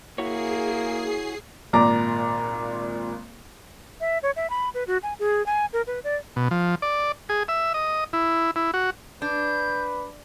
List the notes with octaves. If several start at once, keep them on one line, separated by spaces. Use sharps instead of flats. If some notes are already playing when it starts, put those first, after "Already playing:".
A#3 E4 F#4 G#4 C#5 C7
G#1 A#2 D5 A#5 D6
E5
C#5
E5
B5
B4
F#4
G#5
G#4
G#5
A#4
B4
D5
B2
F3
D5
G#4
E5
D#5
E4
E4
F#4
D4 B4 G6